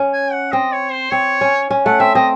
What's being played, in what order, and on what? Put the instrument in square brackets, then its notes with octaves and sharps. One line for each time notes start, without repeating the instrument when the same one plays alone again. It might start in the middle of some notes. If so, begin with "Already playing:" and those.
Already playing: [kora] C#4
[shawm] G#5
F#5
[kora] C4 [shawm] D#5
[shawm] C#5
C5
[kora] C4 [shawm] C#5
[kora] C#4
C#4
[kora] A3 [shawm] F#5
[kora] C4 [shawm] E5
[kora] C4 [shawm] D#5